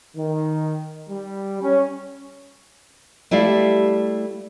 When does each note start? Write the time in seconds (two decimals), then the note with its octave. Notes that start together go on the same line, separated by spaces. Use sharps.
0.16 D#3
1.09 G3
1.61 C#4
3.31 G3 A3 E4 G4 D5 F5